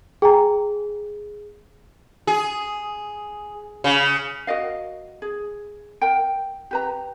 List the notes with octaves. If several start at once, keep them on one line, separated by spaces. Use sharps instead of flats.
G#4 G5 G#5 A#5
G#4
C#3
F#4 A#4 D#5 F5
G#4
A#4 G5
G4 B4 A#5